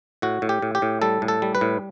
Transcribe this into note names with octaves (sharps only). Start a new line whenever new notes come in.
A2 F#4
A2
G4
A2
G4
A2
G3 A4
A2
A4
G3
B4
A2